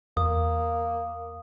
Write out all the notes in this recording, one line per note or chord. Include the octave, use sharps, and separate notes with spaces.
E2 A#3 D#6